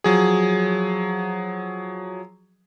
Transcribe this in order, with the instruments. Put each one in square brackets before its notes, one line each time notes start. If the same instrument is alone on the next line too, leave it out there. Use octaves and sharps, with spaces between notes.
[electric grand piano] F3 F#3 G#4